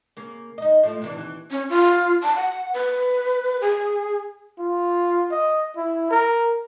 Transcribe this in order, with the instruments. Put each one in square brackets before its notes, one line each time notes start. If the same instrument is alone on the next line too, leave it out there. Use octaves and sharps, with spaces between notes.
[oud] C#3 A#3
D#4 D#5
A2 F3 A3
C3 E3 D4
D#2 E3
[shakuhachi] C#4
F4
A5
F#5
B4
G#4
[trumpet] F4
D#5
E4
A#4